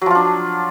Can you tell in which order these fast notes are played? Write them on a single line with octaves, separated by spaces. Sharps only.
F#3 F3 F4 D4